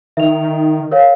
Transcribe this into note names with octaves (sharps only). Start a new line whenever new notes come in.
D#3 E5 F7
A#4 C#5 F5